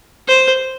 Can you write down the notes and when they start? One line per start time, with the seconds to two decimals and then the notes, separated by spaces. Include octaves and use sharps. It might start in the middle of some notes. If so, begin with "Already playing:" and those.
0.28 C5